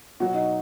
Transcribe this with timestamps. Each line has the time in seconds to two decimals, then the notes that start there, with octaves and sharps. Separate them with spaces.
0.20 B2 F#3 F#4
0.34 D#4